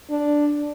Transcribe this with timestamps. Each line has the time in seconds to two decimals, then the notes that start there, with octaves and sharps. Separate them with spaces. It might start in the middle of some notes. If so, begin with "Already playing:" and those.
0.10 D4